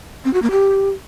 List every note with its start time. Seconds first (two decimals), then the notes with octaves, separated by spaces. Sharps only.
0.25 C4
0.33 F#4
0.42 A#3
0.51 G4